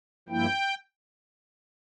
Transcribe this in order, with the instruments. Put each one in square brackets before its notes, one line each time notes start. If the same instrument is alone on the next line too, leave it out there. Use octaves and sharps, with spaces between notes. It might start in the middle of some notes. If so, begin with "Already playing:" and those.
[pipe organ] G2 F3 A#3 E4 G5